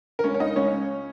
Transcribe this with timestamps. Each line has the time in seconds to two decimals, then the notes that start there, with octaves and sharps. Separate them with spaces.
0.19 A#4
0.24 C#2 C#4 C#5
0.34 C#5
0.40 C#2 D#4 D#5
0.56 C#2 C#4 C#5
0.72 C#2